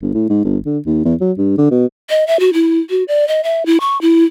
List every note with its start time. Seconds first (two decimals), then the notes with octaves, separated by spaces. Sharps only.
0.02 G1
0.14 A2
0.30 G#2
0.45 G1
0.66 D3
0.86 D#2
1.05 E2
1.21 F#3
1.38 G2
1.58 D3
1.71 B2
2.10 D#5
2.27 E5
2.40 F#4
2.53 E4
2.90 F#4
3.08 D5
3.28 D#5
3.44 E5
3.66 E4
3.80 C#6
4.01 E4